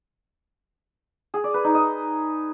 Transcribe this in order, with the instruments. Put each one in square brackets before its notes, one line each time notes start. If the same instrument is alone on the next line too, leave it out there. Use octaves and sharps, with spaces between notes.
[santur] G#4
D5
B4
D#4
D#5